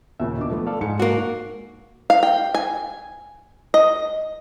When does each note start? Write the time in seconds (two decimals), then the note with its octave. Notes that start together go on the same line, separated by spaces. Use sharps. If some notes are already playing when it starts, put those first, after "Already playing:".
0.20 D#2 A#2 C#3 E5
0.37 B2 D4 D6
0.50 F3 A3 B3
0.67 A4 D5 F5
0.81 G#2 G#3 C#7
1.00 A#3 F#4
2.10 F5
2.23 G5
2.55 G#5
3.74 D#5